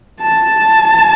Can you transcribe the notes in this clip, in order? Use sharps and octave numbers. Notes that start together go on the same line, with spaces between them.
A5